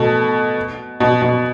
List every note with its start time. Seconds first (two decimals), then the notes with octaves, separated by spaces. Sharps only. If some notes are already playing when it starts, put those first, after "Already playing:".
Already playing: B2 A3
1.00 B2
1.22 B2